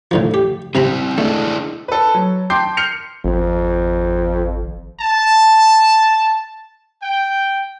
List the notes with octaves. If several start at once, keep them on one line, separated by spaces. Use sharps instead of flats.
A2 D3 F3
G4
C3 C4 E4 A#5 B5
A3 D4 E4 G#4
A4 B4
F#3
G5 A5 C6 D6 G6 C7
F6 G6 C7 C#7 F7
G#1 F2
A5
G5